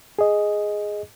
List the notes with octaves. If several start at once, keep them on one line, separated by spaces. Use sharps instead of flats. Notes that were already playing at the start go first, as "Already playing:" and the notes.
G#4 D#5